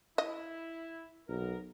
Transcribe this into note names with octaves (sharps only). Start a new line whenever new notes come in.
E4 D#5
B1 B3 A#4